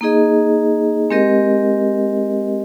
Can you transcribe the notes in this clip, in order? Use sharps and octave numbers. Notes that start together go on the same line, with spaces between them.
A#3 D#4 G#4 D#5
G#3 C4 G4 A#4 D#5